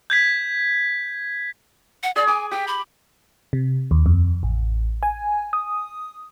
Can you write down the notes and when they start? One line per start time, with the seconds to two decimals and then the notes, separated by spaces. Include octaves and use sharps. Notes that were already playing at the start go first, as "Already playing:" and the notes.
0.10 G6 G#6 B6
2.03 F#5
2.16 G#4 D5
2.27 G#5 D6
2.51 G4 G5
2.67 B5
3.53 C3
3.91 D#2
4.06 F2
4.43 A1
5.03 G#5
5.53 D#6